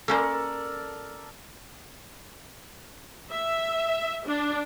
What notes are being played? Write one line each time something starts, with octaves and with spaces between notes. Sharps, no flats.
A#3 C#4 A4 A#4 C5 D5
E5
D4